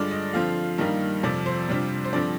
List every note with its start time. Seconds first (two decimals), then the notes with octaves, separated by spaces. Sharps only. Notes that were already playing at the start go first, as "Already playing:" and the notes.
Already playing: G2 D3 G#3 D4 F4 D5
0.11 D#5
0.33 D3 F3 C4 F4 F5
0.78 G2 D#3 G3 A#3 D#4
1.23 F2 C3 F3 D5
1.46 C5
1.69 C3 G3 D4 F4
2.04 C5
2.13 G2 D3 F3 C4 D5